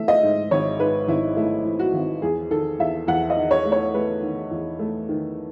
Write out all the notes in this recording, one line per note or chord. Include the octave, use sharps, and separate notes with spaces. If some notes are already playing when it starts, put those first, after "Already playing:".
Already playing: E3 A3 E5
D#5
G#2
G#1 C#5
G#2 B4
G#1 E4
A3 E4
E3
F#4
G#1
E2 G#4
D#3 A4
E2 E5
E2 F#5
D#5
D#3
C#5
A3
C#5
A3 B4
D#3
E2
A3
D#3